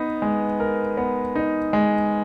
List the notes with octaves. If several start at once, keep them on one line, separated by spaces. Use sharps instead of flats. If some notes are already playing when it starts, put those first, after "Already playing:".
Already playing: B3 D#4
G#3
A#4
B3
D#4
G#3